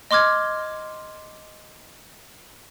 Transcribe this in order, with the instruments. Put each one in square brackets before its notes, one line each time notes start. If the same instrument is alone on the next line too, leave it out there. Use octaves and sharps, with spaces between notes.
[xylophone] D#5 C6 D6 F6 G#6